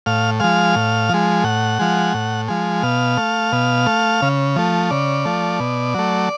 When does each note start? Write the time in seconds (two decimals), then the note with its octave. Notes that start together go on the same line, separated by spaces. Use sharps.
0.06 A2 F5
0.40 F3 G#3 F5
0.76 A2
1.09 F3 G#3
1.44 A2 F#5
1.79 F3 G#3
2.14 A2
2.48 F3 G#3
2.83 B2 F5
3.17 A3
3.52 B2
3.86 A3
4.22 C#3
4.56 F3 A3
4.91 C#3 D5
5.25 F3 A3
5.60 B2
5.94 F#3 A3